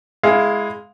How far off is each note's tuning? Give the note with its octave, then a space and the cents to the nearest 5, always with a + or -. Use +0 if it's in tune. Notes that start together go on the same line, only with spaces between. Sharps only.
G#3 +5 E4 +0 F5 +15